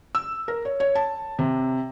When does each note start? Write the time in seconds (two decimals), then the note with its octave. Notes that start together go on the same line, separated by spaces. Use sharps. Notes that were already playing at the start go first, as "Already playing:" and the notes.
0.15 E6
0.48 A#4
0.65 C#5
0.80 C#5
0.95 A5
1.39 C3